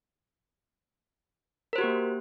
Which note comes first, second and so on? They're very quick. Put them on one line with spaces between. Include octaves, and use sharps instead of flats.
A#4 C5 F#4 G4 A#3